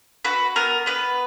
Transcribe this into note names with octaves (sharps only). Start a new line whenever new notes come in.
F#4 B4
B3 A#4
B3 B4